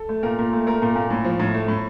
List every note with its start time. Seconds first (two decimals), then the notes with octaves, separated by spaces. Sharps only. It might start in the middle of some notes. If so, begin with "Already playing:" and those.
Already playing: A4
0.09 A3
0.23 A#2 A#4
0.38 A#2
0.53 A3
0.67 A3 A#4
0.82 A#2
0.95 A#2
1.10 A2
1.24 F3
1.40 A2
1.54 A3
1.68 A2